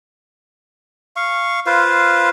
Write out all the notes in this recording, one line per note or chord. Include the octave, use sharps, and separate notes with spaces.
F5 C#6
F4 B4 C5 F5